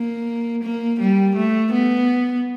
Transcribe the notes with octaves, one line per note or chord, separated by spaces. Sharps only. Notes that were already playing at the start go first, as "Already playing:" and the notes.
Already playing: A#3
A#3
G3
A3
B3